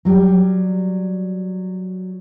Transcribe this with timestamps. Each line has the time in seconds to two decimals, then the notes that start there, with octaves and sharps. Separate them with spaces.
0.05 F#3 G3